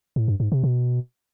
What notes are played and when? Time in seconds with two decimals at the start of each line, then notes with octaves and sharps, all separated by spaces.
0.16 A2
0.28 G2
0.40 G#2
0.52 C3
0.64 B2